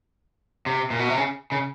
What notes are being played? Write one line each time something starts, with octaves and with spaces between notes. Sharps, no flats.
C3
A#2
B2
C3
C#3
C#3